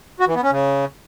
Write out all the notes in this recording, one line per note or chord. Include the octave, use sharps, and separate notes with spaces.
F#4
E3
B3
C#4
C#3